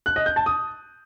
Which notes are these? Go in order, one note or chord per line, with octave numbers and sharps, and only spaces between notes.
F#6
D#5
G6
A5
D#6